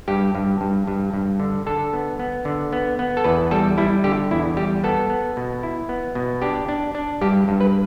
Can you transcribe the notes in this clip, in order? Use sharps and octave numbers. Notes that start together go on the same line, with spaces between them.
G2 G4
G2
G2
G2
G2
D3
D3 A4
B3
B3
D3
B3
B3
A4
E2 B4
G3 A4
G3 E4
D3 G4
E2 E4
G3 G4
B3 A4
B3
B2
E4
B3
B2
D4 G4
D4
D4
G2 G4
G2
B4